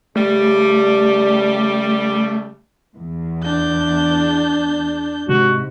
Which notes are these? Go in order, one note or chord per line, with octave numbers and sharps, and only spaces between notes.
C#3 G3 A3
E2
D4 G6
G#2 C3 F#4